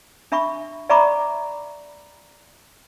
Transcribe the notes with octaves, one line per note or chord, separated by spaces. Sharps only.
D4 E5 B5 C#6
D5 E5 A#5 B5 C#6 D6